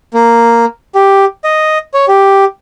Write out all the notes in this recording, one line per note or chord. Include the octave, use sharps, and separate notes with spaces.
A#3
G4
D#5
C#5
G4